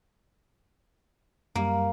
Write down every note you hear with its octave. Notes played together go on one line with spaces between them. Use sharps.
F#2 G3 A#3